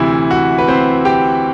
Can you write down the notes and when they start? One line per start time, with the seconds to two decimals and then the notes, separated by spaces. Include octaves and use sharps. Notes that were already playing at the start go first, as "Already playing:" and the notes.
Already playing: D2 C3 E3 E4
0.31 F#4
0.58 B4
0.68 C4 C5
1.05 G4 G5